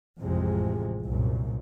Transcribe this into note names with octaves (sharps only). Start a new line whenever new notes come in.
A1 F2 C3 G#3
C2 F#2 A#2